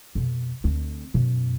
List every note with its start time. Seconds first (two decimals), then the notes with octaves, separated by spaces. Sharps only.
0.15 F2 B2
0.64 D2 C4
1.14 F#2 B2